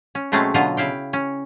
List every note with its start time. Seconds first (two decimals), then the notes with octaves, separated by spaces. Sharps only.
0.15 C#4
0.32 B2 F#3 G#3 A3 C4 C#4
0.54 B2 D3 F#3 F4 D#5 A#5
0.77 C#3 E4 F5 G5
1.13 C#4